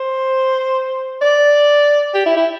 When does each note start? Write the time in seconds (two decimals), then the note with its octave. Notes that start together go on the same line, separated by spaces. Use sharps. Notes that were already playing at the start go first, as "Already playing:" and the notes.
Already playing: C5
1.22 D5
2.14 G4
2.26 E4
2.37 E4